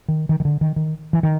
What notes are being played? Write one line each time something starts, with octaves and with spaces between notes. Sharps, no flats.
D#3
D#3
D#3
D3
D#3
D#3
E3
D#3